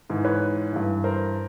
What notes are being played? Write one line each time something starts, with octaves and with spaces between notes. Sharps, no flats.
G#2 E3
B4 C#5
G2 E3
A#4 C5